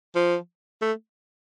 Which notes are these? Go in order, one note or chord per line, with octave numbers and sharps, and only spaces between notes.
F3
A3